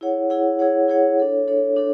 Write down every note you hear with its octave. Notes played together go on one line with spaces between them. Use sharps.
E4 G#4 C#5 F#5
E4 G#4 C#5 F#5
E4 G#4 C#5 F#5
E4 G#4 C#5 F#5
D4 A4 C#5
D4 A4 C#5
D4 A4